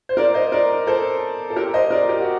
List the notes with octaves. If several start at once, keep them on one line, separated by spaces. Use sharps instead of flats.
C5
A#4 D5
C5 D#5
A#4 D5
A4 C5
A4
G4 A#4
C5 D#5
A#4 D5
G4
F#4